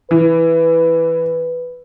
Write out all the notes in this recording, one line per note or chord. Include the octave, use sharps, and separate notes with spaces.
E3 B4